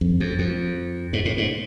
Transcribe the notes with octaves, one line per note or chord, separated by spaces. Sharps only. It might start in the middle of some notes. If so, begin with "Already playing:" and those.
F2
F2
F2
G#2
A2
G#2